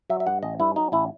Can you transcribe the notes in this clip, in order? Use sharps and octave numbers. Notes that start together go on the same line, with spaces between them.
F#3 E5
E5
G2 F#5
A1 D#5
G2 E4
F#3 D#4
A1 E4